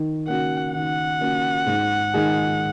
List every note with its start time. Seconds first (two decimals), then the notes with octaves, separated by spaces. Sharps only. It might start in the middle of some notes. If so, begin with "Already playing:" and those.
Already playing: D#3
0.27 A#3 C#4 F#4 F#5
0.74 D#3 F#5
1.20 A#3 C#4 F#4
1.66 G#2
2.14 D#3 G#3 D#4 G#4